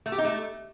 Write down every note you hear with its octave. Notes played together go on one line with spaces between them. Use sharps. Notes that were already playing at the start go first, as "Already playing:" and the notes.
A3
G4
D#4
A3